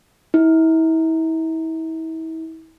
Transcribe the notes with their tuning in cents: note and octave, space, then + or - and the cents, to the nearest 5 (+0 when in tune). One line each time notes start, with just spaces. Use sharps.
E4 -35